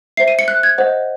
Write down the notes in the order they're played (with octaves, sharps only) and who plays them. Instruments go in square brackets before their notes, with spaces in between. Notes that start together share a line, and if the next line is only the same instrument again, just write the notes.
[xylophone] C5 E5 C7
D#7
C#7
F#6
G#6
C5 D#5 F#5